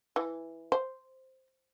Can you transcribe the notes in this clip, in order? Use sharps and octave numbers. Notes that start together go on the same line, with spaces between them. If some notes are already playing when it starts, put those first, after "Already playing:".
E3
C5